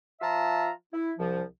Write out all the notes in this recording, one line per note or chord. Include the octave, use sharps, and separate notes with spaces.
F3 F4 E5 A5 A#5
E4
C2 F3